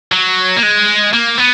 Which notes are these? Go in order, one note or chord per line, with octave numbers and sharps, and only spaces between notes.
F#3
A#3
G#3
A#3
B3